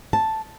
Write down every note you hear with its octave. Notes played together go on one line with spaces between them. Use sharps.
A5